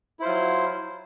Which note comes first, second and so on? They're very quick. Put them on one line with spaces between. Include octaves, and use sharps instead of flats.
E4 C5 F4 F#3